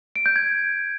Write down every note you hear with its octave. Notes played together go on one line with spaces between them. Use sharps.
D7
G6
G#6